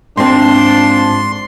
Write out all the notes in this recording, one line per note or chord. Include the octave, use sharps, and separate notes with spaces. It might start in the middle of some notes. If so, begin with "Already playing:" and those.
G#2 F3 C4 D4 C6